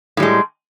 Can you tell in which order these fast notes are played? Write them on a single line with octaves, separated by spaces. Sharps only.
A2 G3 G#3